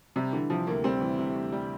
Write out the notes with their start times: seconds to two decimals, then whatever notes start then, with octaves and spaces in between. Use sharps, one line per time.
0.16 C3 G3
0.32 D3 E3
0.50 C3 F3
0.67 D2 A#3
0.84 G3 C4
1.01 E3
1.18 C3
1.35 D2
1.52 G3